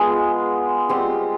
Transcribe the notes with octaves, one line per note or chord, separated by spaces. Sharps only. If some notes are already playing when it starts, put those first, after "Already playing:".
Already playing: G#3 B3 F4 G#4
G3 C4 F4 G4